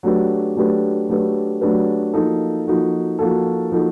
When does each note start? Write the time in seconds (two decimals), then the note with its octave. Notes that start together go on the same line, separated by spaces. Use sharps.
0.03 F#3 A3 D4 G4 B4
0.56 F#3 A3 D4 G4 B4
1.08 F#3 A3 D4 G4 B4
1.61 F#3 A3 D4 G4 B4
2.14 F3 A#3 D#4 F#4 A4
2.66 F3 A#3 D#4 F#4 A4
3.19 F3 A#3 D#4 F#4 A4
3.72 F3 A#3 D#4 F#4 A4